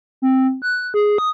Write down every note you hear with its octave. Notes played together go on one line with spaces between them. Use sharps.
C4
F#6
G#4
D#6